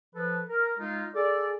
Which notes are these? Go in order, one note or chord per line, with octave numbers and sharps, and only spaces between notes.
F3 A4 B4
A#4
G#3 D#4 F4
G#4 A4 D5